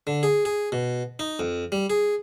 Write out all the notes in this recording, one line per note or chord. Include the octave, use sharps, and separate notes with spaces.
D3
G#4
G#4
B2
D#4
F2
G3
G#4